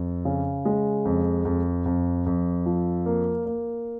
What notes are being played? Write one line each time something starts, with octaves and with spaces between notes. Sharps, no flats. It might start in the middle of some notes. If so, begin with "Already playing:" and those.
Already playing: F2
C#3
G#3
F2
F2
F2
F2
F3
A#3
A#3